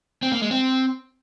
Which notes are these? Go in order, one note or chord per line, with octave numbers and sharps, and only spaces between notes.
C4
A#3
G#3
C4